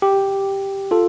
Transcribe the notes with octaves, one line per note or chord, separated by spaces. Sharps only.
G4
F4 A4